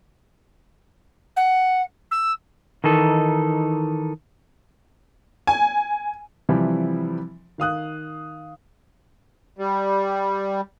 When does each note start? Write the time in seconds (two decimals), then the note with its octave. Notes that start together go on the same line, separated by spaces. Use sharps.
1.36 F#5
2.11 E6
2.84 D#3 E3 D#4 A4
5.47 G#5
6.49 C3 E3 F3 G3 C4 E4
7.58 D#3 F5 D#6 F#6
9.59 G3